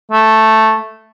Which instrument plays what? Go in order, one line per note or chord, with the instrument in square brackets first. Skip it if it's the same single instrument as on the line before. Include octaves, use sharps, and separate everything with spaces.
[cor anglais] A3